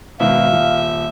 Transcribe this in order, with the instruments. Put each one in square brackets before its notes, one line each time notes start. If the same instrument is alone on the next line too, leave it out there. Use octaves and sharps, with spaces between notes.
[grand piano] G#1 B2 [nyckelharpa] E5 [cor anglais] F5
[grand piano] D#1